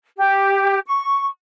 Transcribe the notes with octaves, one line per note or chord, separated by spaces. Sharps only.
G4
C#6